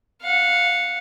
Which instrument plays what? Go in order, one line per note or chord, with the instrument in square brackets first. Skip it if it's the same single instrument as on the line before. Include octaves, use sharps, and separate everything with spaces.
[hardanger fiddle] F5 F#5